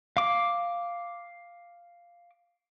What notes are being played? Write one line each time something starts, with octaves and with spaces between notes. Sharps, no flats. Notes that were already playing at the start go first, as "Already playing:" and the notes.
F5 D6